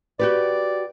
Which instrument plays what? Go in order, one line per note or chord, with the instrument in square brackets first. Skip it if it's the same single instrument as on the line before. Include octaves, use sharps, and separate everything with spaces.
[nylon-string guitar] F#4 G4 B4 [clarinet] D5